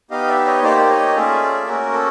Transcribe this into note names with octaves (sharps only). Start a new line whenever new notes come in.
B3 D#4 G4 D#5 F5
D5 E5
C#5 D#5
A#3 D#4 G4 C5 D5
D5
C#5 D#5
A3 C#4 F4 G#4 D5 E5
A#3 C#4 F#4 A#4
A4